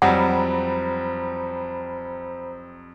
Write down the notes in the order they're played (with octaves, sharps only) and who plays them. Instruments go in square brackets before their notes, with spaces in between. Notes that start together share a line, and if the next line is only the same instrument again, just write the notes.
[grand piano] F2 F#3 G3 [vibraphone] C5 A#5 B5 [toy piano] F#5